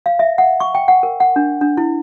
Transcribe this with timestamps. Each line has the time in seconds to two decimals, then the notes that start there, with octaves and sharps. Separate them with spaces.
0.06 F5
0.19 E5
0.38 F#5
0.60 C#6
0.75 G5
0.88 F#5
1.03 A#4
1.20 F#5
1.36 D4
1.61 D4
1.77 E4